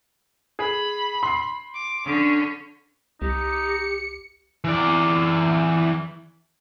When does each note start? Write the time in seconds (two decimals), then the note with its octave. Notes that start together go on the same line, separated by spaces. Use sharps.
0.59 G#4 B5
1.23 C6 C7
1.74 D6
2.06 D3 C#4
3.22 C2 D#4 G4 C#7
4.64 E3 D5